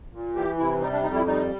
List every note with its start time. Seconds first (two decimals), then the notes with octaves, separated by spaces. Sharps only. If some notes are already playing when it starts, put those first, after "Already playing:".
0.13 A#2
0.35 E3 G4
0.58 C3 E4
0.80 G3 D#4
0.92 D4
1.04 F2 D#4
1.15 E4
1.26 G3 D#4